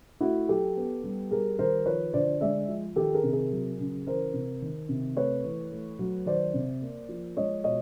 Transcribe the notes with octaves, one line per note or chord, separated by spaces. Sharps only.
A3 E4 F#4
F#3 G4 A4
B3
G3
G3 G#4 A#4
D#3 A#4 C5
F3 B4 C#5
D3 C5 D5
G#3 D5 E5
F3
D#3 G4 A4
G#4 A#4
C3
G#4 A#4
F#3
C#3
E3 A#4 C5
C3
D#3
C3
A3 B4 C#5
E3
A3
F#3
D#3 C5 D5
C3
A#3
F3
G#3 C#5 D#5
B2 C#5 D#5